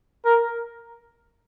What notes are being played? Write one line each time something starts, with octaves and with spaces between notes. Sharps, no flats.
A#4